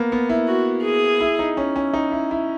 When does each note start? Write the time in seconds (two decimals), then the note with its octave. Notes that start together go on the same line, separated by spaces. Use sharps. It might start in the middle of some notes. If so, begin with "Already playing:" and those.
Already playing: A#3 B3
0.12 B3
0.29 E4
0.48 F#4
0.84 G#4
1.21 E4
1.39 D#4
1.57 C#4
1.76 C#4
1.94 D#4
2.12 E4
2.31 E4